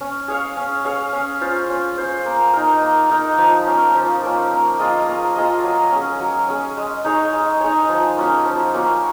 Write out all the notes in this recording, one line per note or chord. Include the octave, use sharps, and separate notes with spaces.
C#4
G#4 C#5 F5
C#4
G#4 C#5 F5
C#4
F4 C5
C#4
F4 C5
A#3
D#4 A#4
A#3
D#4 A#4
F3
A#3 C#4
F3
A#3 C#4
A#3
F4 G#4 D#5
A#3
F4 G#4 D#5
F#3
C#4 G#4
F#3
C#4 G#4
G#3
D#4 G#4 C#5
G#3
D#4 G#4 C#5
F3
A#3 C#4 F#4
F3
A#3 C#4 F#4